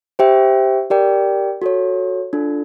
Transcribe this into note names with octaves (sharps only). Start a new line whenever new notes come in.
G4 C5 E5 G5
G4 A#4 D5 G5
F#4 A4 C#5
D4 F4 A4